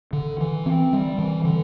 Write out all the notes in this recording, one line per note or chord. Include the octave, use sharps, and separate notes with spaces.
D3
E3
C4
G3
E3
D3